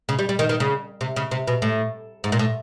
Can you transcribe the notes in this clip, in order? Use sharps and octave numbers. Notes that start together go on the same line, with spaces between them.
C#3
G3
G3
D#3
D#3
C#3
C3
C#3
C3
B2
A2
G#2
A#2
A2